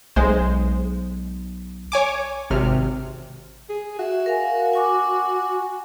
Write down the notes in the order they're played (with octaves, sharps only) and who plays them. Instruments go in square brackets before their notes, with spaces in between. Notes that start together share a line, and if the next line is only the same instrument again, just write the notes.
[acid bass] B1 [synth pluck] G#3 C5
[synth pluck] C#5 G#5 D6
G#1 C3 F6
[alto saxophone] G#4
[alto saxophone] F#4 [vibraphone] E5
[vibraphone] A#4 F5 G#5
G#5 C#6 D6